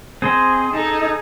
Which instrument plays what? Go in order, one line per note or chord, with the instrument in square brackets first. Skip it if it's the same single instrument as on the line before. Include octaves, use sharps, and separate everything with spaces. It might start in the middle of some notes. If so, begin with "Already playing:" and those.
[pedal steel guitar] C4 C5 D#5 [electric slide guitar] G#4
[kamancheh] D#4 [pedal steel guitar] A4